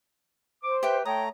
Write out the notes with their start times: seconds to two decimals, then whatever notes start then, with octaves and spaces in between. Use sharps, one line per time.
0.63 C5 D6
0.83 G4 B4 E5 G5
1.05 A3 C#5 G5 A#5 D#6